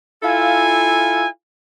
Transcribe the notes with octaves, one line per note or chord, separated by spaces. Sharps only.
E4 F4 A4 F5 G#5